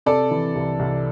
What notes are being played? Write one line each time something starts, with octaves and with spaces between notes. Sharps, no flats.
C3 A4 D5
E3
C2
C2